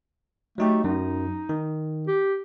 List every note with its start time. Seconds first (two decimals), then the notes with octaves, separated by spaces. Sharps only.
0.58 F#3 A3 D#4 G4
0.84 F#2 D#4
1.49 D#3
2.08 G4